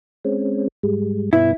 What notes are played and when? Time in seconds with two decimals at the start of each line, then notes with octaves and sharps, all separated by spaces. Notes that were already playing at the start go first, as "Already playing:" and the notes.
0.25 G#3 C4 C#4
0.83 G#2 G3 G#3
1.33 G2 B2 B3 E4